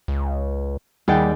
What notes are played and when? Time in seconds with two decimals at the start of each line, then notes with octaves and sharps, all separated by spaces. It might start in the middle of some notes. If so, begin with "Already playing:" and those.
0.08 C#2
1.08 D#2 G3 G#4 F#5 G5 A6